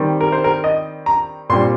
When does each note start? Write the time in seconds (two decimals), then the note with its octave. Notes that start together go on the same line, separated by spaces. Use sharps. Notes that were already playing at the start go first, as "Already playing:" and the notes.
Already playing: D#3 G3 C4
0.21 A#4
0.32 C5
0.44 A#4
0.64 D#5
1.06 A#5
1.50 A#2 G3 C4 C6